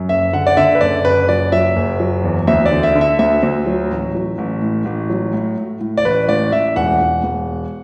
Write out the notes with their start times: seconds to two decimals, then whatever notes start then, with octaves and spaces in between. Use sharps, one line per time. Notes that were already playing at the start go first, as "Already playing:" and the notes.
Already playing: F#2
0.09 F#1 E5
0.33 D3 F#5
0.47 D5
0.57 D3 E5
0.75 B4
0.81 F#1 D5
1.05 F#1 B4
1.29 F#3 D5
1.52 F#3 E5
1.76 F#1
2.00 F#3
2.24 E2
2.47 D2 E5
2.66 D5
2.71 D3
2.83 E5
2.95 D3
3.01 E5
3.19 D2 E5
3.43 D2
3.66 F#3
3.90 A1
4.15 F#3
4.38 A1
4.62 A2
4.85 A1
5.09 F#3
5.33 A2
5.57 A2
5.81 A2
5.97 D5
6.05 A1 B4
6.28 A1 D5
6.52 A1 E5
6.76 E1 F#5
7.00 E1
7.24 E1